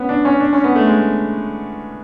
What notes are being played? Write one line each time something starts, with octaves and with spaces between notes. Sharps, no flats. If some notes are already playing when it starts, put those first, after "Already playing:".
Already playing: B3 C#4
D4
C#4
D4
C#4
B3
A3
G#3